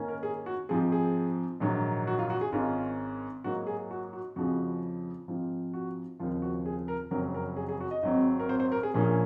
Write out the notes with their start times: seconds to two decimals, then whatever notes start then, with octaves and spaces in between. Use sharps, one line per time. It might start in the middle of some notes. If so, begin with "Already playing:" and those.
Already playing: G#2 D#3 A#3 C#4
0.08 A#4
0.23 G#4
0.46 F#4
0.69 G#2 F3 C4 G#4
0.92 G#4
1.60 A#1 G#2 D#3 F#3
2.07 F#4
2.19 F4
2.30 F#4
2.41 G#4
2.52 G#1 G#2 D#3 G#3 C#4 F4
3.44 G#2 F#3 A#3 F#4
3.67 G#4
3.91 F#4
4.13 F#4
4.36 F2 C#3 F3 G#3 F#4
5.28 G#2 F3 C4 F4
5.74 F#4
6.19 D#2 C#3 F3 C4 F4
6.42 F#4
6.66 G#4
6.88 A#4
7.11 F#1 F2 C#3 F#3 C4 A#4
7.34 A#4
7.56 G#4
7.69 G#4
7.81 F#4
7.91 D#5
8.03 G#1 G#2 F#3 C4 D#5
8.39 A#4
8.49 C5
8.60 C5
8.72 A#4
8.83 G#4
8.94 A#1 A#2 F3 A#3 C#4 G#4